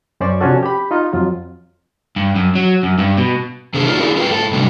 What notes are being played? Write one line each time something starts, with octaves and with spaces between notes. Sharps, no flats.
F#2 C#4 C5 D5 C#6
C3 F3 C#4 D4 F#4 A4
G4 B5
D#4 F4 D#5
F2 F#3 F4
G2
F#2
F#3
F#2
G2
B2
C3 D#3 D4 G#4 A4 C5
D#4 F4 F#4 A#4 C#5 D5
C#4 D4 E4 G#4 D5
F4 A#4 B4 D5 F5 G5
G#2 A4
G#2 C3 F#3 G3 D4